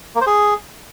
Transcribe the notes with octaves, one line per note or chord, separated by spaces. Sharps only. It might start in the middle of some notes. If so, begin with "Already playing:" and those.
A#3
C5
G#4